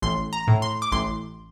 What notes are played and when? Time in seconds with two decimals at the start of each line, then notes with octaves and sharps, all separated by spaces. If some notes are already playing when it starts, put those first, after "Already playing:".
0.02 A1 C6
0.33 A#5
0.48 A2
0.62 C6
0.82 D6
0.92 A1 C6